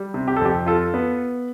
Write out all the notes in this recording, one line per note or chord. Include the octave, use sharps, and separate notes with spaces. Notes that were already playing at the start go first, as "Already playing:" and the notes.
Already playing: G3
C3
G4
A4
F2 G4
F4 A4
B3